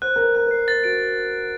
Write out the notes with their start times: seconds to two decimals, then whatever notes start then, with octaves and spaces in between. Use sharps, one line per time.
0.02 C5 F#6
0.16 A#4 F#6
0.24 B4
0.35 A#4 F#6
0.46 B4
0.51 C7
0.68 C5 A6
0.84 F#4 D7